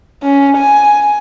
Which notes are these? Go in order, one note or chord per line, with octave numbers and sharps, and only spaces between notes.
C#4
G#5